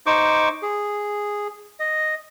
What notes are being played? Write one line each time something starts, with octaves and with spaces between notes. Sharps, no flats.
D#4 C5 C#6 D6
G#4
D#5